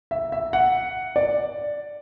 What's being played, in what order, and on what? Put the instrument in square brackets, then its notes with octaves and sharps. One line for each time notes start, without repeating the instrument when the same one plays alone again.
[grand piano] E5
E5
F#5
D5